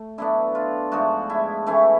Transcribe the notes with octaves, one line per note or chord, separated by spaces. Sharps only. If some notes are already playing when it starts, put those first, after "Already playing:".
Already playing: A3
D3 F#3 B3 D4 E4
F4
G#2 F3 A3 D4 F#4
E4
E3 A3 C#4 E4